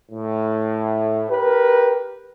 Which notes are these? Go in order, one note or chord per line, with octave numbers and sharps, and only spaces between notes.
A2
G4 A#4 B4